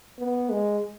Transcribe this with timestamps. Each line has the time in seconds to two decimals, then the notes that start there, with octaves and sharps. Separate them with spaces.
0.19 B3
0.50 G#3